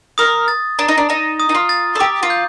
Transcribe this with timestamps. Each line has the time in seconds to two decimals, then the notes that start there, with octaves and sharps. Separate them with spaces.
0.18 A#4 D#6
0.48 A6
0.79 D4 A#5
0.88 D#4
0.98 D4
1.09 D#4 A#5
1.40 D#6
1.49 D#4
1.55 F4
1.69 A6
1.95 A4
1.99 G4 D6
2.23 F4
2.30 G6